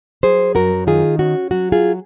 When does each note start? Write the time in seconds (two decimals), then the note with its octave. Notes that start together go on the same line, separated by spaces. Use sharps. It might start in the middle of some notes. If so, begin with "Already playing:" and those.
0.23 F#3 G#4 C5
0.55 F#2 F#4 A#4
0.87 D#3 F4 G#4
1.19 C#4 F#4
1.51 F#3 F#4
1.72 F4 G#4